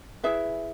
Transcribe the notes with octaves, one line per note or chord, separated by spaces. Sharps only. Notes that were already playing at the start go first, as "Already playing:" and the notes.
E4 G#4 B4 E5